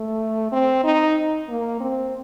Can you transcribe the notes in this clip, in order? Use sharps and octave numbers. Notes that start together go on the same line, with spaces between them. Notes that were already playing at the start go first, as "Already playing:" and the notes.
Already playing: A3
C4
D#4
A#3
C4